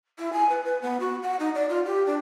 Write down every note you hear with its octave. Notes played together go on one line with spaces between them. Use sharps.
E4
G#5
B4
B4
B3
F#4
F#5
D#4
D5
F4
G4
D4